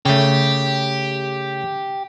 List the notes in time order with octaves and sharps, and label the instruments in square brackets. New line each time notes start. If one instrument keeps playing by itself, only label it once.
[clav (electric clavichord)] C#3 A3 [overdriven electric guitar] G4